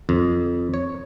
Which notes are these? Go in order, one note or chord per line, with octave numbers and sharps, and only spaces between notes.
F2
C#5